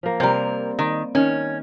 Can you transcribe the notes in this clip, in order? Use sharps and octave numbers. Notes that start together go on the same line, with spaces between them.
F3 A#3
C3 G3 C4 A#4
D#3
D#3 C#4